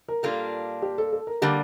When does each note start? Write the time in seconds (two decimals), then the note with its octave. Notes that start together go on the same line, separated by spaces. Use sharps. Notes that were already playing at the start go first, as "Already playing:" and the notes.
0.08 A#4
0.23 A#2 G3 A#3 D4 F4 A4
0.82 G4
0.98 A4
1.13 A4
1.27 A#4
1.42 D3 G3 A#3 G4